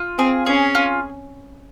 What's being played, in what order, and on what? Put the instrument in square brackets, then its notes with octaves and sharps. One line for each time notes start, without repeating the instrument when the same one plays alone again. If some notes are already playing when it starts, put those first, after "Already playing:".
Already playing: [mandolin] F4
[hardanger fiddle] C4 [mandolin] G#4
[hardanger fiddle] C#4 [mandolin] G#4
[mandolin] F4